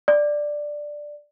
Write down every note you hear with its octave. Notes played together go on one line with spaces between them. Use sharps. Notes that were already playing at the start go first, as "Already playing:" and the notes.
D5